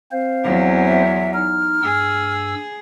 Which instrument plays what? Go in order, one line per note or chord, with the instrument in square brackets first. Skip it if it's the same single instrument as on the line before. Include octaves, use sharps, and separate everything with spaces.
[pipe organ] C4 C5 [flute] F5
[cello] E2 F#3
[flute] E5
[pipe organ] D#4 [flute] F6
[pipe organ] G2 E6 [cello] G#4